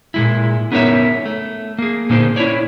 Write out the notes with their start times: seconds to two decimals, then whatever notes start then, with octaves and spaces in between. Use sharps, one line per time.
0.14 A#2 G#3 E4
0.72 B3 C#4 D#4 A#4 C#5 E5
1.26 A3
1.79 A#3 G#4
2.10 A#2 D3 A#3 D#4 C5
2.36 C#4 E4 A4 C#5 D5